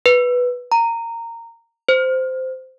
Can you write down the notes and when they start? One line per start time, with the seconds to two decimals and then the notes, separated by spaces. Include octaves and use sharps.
0.06 B4
0.72 A#5
1.89 C5